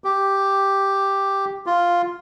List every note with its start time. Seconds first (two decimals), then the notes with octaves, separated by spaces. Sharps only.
0.04 G4
1.66 F4